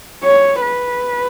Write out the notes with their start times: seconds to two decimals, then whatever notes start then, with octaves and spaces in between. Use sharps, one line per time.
0.24 C#5
0.61 B4